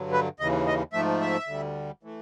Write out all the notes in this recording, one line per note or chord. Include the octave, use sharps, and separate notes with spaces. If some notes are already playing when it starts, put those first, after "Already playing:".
Already playing: G2 D3 F#3
B4
D#2 C#3 E3 D#5
D#5
G#2 F3 A3 E5
E5
D2 D3 G3
E3 A3